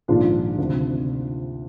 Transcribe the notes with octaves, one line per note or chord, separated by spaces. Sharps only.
A#1 G#2 D#3 D4 F4
D2 C3 D#3